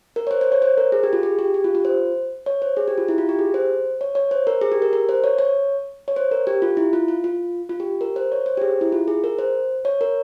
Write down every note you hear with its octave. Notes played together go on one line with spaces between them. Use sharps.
A#4
C#5
C5
C5
C#5
C5
A#4
G#4
G4
F4
G#4
G4
G4
F4
F4
C5
C#5
C5
G#4
G4
F4
E4
F4
G4
G#4
C5
C#5
C#5
C5
A#4
G#4
G4
A#4
A#4
C5
C#5
C#5
C#5
C5
A#4
G4
F4
E4
F4
F4
F4
F4
G4
A#4
C5
C#5
C5
G4
G#4
E4
F4
G#4
A#4
C5
C#5
A#4